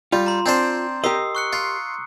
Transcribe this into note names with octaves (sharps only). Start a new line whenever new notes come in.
G3 F4
A#5 C6
C4 D4 C5
G4 A#4 D#5 D#6 E6 C7
C#6 F#6 C#7
F4